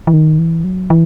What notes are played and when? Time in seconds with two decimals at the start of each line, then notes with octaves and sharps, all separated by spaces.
0.07 E3
0.14 D#3
0.39 E3
0.64 F#3
0.90 E3